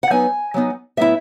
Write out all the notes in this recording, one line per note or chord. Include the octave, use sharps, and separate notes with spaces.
F#5
F#3 B3 D#4 G#5
F#3 B3 D#4
A2 F#3 B3 E4 E5